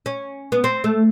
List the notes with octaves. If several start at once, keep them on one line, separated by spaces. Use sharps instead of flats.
C#4
B3
C4
A3